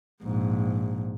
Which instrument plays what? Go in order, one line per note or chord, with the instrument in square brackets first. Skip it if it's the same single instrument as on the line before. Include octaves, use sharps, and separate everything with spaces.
[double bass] A#1 G#2